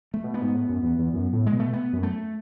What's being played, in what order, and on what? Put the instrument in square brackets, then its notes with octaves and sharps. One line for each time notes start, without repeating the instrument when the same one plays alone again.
[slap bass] A3
[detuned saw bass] B2
[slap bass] B3
[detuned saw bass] G#2
A2
F#2
E2
E2
F#2
A2
[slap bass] G#3
[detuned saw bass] B2
[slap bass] A3
B3
[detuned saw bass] F#2
[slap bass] A3